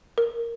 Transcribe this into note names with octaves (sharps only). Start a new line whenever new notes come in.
A#4